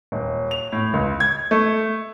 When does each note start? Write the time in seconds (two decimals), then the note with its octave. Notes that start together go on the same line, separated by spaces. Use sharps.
0.12 D#1
0.51 F7
0.72 A2
0.94 C#2
1.20 G#6
1.51 A3